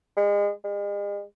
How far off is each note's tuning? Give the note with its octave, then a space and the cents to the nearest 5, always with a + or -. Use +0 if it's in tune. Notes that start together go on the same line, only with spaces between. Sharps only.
G#3 -30
G#3 -40